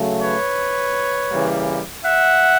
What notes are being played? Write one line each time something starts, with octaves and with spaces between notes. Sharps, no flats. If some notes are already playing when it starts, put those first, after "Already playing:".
Already playing: C#3 F#3 A3
B4 C#5
C#3 E3 G3 A#3
E5 F#5